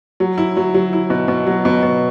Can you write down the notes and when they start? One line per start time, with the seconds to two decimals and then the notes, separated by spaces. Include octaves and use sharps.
0.20 F#3
0.38 E4
0.57 F#3
0.74 F#3
0.93 E4
1.10 B2
1.28 B2
1.47 F#3
1.65 B2
1.83 B2